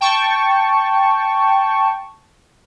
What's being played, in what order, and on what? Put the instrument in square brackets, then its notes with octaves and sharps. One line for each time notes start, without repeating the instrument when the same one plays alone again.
[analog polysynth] G5 A5 C#6